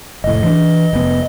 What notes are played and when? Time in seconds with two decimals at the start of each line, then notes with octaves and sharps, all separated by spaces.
0.24 F1 A2 D#5
0.43 E3 D4
0.93 F1 B3